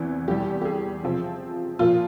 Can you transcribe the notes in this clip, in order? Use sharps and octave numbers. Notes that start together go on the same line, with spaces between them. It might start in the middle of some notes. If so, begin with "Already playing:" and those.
Already playing: E2 C3 E3
E2 E3 G3 G4
G4
G#4
C3 F3 C4
A#2 F3 A#3 F4